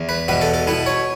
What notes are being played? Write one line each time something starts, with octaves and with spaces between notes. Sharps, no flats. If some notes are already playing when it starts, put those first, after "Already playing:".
Already playing: E2
B4
E2 B2 B3 B4
A4
A4
B2 B3 E4
C#5